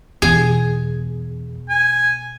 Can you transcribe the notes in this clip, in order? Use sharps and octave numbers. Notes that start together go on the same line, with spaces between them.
E2 B2 G#4
G#5